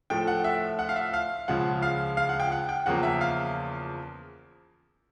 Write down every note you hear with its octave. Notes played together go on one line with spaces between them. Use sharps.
A2 F3 A3 G5
F#5
E5
F#5
F5
E5
F5
C#2 C#3 F3 G#3 F#5
F5
F5
F#5
G5
F#5
G5
E2 C#3 F3 A#3 F#5
E5
F5